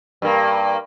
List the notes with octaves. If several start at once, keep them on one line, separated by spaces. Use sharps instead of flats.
G2 A#3